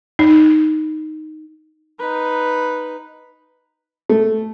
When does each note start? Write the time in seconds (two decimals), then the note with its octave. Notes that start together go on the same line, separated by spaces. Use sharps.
0.19 D#4
1.99 D#4 B4
4.09 A3